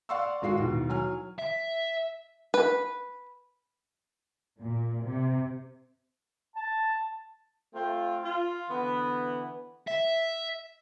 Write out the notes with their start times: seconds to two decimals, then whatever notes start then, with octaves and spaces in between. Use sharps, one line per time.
0.09 D5 F5 F#5 C6 C#6 E6
0.42 G#1 G#3 F4 F#4 C7
0.58 D#2 B2 E3
0.89 F#3 G#5 F6
1.39 E5
2.54 B4
4.60 A#2
5.04 C3
6.56 A5
7.74 A3 C4 F4
8.23 F4
8.69 D3 E3 B3
9.87 E5